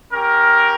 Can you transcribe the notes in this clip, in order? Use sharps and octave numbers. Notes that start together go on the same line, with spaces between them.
C#4 G4 A#4